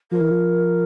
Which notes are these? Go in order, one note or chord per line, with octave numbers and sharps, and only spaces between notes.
F3 A#4
E3
F3